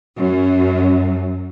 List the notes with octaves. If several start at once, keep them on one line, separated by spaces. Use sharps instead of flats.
F#2